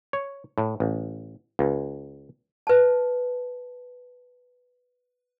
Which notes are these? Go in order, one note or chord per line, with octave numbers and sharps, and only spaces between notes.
C#5
A2
A1
C#2
B4 A5